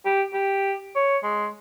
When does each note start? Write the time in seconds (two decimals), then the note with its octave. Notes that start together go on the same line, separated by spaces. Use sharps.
0.06 G4
0.34 G4
0.96 C#5
1.24 G#3